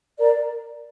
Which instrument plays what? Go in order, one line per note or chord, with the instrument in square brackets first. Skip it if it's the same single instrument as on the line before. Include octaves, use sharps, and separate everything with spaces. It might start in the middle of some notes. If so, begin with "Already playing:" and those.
[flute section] A#4 D5 A#5